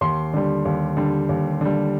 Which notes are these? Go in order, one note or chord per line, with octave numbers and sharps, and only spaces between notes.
D#2 C6
D3 G3
D#2
D3 G3
D#2
D3 G3